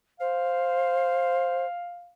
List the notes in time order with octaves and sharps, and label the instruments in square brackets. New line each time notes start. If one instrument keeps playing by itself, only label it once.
[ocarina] C5 [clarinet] F5